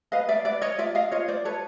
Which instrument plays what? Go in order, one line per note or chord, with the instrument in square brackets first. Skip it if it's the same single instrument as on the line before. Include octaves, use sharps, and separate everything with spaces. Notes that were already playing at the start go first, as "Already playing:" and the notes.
[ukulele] B4 D#5 F5
D5 E5
B4 D5 E5
C#5 D#5
F4 D5 E5
D#5 F5
F4 C#5 D#5
C5 D5
A4 B4 C#5